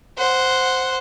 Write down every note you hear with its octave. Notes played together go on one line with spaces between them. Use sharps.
C5 F#5